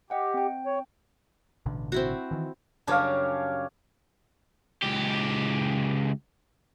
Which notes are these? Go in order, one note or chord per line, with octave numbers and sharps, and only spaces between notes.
G4 D#5 F#5 G5
C4 G5
C#5
A1 B2 D3
C4 E4 F#4
D#3 E3
F#2 C#3 G3 D4 C#5 F5
C#2 G4